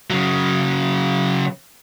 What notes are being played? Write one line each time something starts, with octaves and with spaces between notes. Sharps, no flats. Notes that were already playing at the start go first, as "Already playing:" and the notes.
C#3 F#3